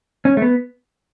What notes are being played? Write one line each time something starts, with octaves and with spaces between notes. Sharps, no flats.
C#4
A3
B3